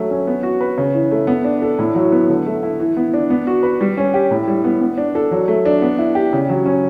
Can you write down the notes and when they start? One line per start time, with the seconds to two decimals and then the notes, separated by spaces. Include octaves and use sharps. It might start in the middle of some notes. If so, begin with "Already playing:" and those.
Already playing: F#3 A3
0.11 C#4
0.27 B3
0.43 F#4
0.61 B4
0.78 C#3
0.94 E3
1.11 A3
1.27 B3
1.44 D4
1.62 A4
1.79 A2
1.95 F#3
2.12 B3
2.29 D3
2.46 A3
2.63 E4
2.80 E3
2.97 B3
3.14 D4
3.30 B3
3.47 F#4
3.63 B4
3.81 G3
3.97 C#4
4.14 G4
4.31 A2
4.48 G3
4.64 B3
4.82 B3
4.98 D4
5.15 A4
5.31 F#3
5.48 A3
5.65 D4
5.82 B3
5.99 E4
6.15 G4
6.33 C#3
6.49 F#3
6.66 C#4